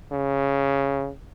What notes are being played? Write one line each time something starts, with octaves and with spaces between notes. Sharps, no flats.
C#3